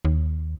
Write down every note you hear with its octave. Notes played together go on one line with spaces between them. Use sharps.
D#2